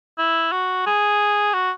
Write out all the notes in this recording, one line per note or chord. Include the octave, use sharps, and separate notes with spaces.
E4
F#4
G#4
F#4